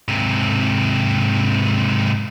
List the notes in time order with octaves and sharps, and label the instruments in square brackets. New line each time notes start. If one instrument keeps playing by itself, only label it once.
[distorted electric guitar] G#2 C3